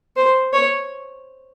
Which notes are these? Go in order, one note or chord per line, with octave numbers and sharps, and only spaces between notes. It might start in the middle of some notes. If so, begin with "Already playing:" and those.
C5
C#5